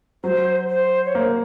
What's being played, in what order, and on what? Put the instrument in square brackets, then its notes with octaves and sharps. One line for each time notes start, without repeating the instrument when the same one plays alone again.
[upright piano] F#3 [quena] C5
[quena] C5
C#5
[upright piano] A#3 [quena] C5